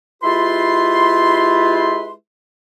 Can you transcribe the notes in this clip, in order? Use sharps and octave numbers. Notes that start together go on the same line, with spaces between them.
G#3 E4 F4 G4 B4 C6